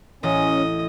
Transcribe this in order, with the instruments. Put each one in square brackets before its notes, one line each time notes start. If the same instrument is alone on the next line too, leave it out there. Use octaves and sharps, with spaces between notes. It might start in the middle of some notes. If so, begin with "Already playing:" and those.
[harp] A1 [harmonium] C#4 [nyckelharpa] D#5